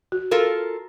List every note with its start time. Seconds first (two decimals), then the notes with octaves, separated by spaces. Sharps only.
0.12 F#4
0.31 F4 A4 A#4